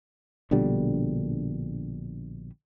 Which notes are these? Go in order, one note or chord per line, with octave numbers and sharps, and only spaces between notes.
A#1 B2 D3 G3